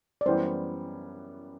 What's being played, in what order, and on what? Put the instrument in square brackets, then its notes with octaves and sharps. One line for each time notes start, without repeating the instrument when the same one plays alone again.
[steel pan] D5
[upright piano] F#2 E3 G3 B3 [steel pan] C5